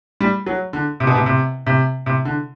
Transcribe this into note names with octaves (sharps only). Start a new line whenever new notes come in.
G3
F#3
D3
C3
B2
C3
C3
C3
C3
D3